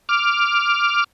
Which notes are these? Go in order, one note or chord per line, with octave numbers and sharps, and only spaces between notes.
D6 F6